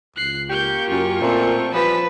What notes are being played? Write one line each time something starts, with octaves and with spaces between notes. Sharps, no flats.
C#2 F#6 C7
A#3 G4 C#6 G6
F#2 F4 C#6
A#2 A3 C4
E3 F3 G3 B3 B4 A5 B6